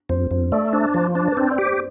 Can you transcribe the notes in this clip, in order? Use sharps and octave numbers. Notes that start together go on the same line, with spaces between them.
F2 C5
F2 C5
A3 D5
D4 C5
F3 C5
D4
B4
C4 C5
D5
G4
C5